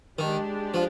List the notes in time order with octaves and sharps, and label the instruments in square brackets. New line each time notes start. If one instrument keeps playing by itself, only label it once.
[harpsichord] D#3 [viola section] G#3 D4 G4
[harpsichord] F3